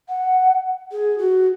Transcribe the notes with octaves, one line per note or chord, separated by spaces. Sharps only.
F#5
G#4
F#4